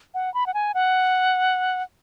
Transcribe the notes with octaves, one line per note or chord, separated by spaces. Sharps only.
F#5
B5
F#5
G#5
F#5